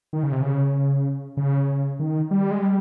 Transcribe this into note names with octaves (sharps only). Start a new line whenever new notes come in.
D#3
C#3
C3
C#3
C#3
D#3
G3
G#3
G3